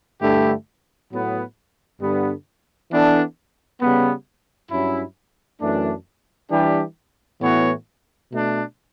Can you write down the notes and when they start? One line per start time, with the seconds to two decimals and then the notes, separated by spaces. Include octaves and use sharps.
0.21 G2 D3 A3 E4 G4
1.10 A2 F#3 B3
2.00 G2 D3 G3 B3
2.90 E3 B3 D4 A4
3.80 C#3 G3 B3
4.71 G2 F#3 C#4 E4
5.60 F#2 E3 A3 D4
6.50 E3 G3 D4 G4
7.41 A2 E3 B3 F#4 C#5
8.31 B2 A3 D4